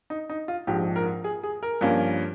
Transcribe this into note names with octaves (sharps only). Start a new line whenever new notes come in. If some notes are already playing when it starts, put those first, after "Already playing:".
D#4
D#4
F4
A#1 G#2 F3 G4
A#4
G#4
G#4
A#4
G2 F3 A#3 C#4